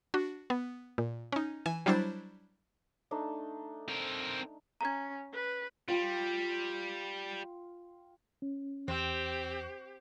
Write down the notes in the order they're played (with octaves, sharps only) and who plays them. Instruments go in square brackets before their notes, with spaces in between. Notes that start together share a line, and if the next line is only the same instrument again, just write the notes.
[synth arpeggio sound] D4 F#4
B3
A#2
C#4 D#4
E3 G#5 E7
F#3 G3 D4 E4 C5 A6
[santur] A3 D4 D#4
[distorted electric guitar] C4 A#4
[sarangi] C#4 [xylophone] A#5 G#6
[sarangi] B4
[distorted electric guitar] G3 [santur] F4 G5
[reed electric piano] C#4
[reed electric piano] E2 [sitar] C4 [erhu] G4